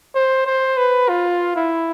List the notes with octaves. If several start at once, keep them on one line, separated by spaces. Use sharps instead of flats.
C5
C5
B4
F4
E4